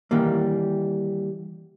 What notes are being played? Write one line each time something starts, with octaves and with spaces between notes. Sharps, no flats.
D#3 E3 G3 A#3